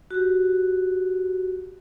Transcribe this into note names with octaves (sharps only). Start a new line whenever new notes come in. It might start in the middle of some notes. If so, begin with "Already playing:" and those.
F#4 G4